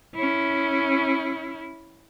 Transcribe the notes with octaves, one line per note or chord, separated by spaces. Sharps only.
C#4 E4